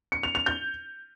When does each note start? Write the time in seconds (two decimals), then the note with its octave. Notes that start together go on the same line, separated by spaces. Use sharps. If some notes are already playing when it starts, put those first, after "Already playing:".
0.12 C#7
0.23 F7
0.35 F7
0.46 G6